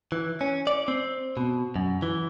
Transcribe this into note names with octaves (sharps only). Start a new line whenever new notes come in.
E3
C#4
D5
C4
B2
F#2
E3